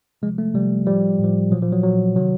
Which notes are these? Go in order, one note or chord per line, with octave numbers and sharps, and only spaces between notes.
C3 F3 G#3
A3
C3 F3 G3
A2 F3 G3
A2
F3
A#2 F3 F#3
F3
F#3
A#2 F3 F#3
C3 D#3 F#3